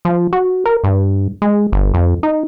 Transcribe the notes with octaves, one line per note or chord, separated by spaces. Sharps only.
F3
F#4
A#4
G2
G#3
G1
F2
D#4